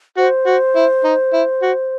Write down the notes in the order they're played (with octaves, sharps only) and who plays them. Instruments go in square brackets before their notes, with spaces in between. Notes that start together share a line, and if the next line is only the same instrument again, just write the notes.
[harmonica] F#4 [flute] C5
[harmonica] F#4
E4
D#4
E4
F#4